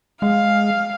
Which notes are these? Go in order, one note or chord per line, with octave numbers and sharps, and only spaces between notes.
G#3 F5